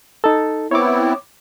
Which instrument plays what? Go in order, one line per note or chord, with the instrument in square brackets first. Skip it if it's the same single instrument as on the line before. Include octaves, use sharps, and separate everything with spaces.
[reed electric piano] D#4 A4
[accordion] B3 C4 E4 [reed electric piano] C#5 D6